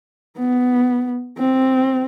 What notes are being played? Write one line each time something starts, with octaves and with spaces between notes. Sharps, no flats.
B3
C4